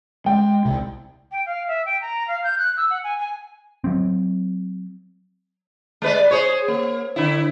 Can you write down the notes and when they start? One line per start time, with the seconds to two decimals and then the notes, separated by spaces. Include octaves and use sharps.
0.26 G#3 G5
0.65 C2 C3
1.32 G5
1.46 F5
1.68 E5
1.86 G5
2.01 A#5
2.28 F5
2.44 G6
2.59 F#6
2.77 E6
2.90 F#5
3.04 G#5
3.19 G#5
3.84 F#3 C4
6.02 G#3 B4 D5
6.31 G#4 C5 C#5
6.68 A#3
7.16 D3 E4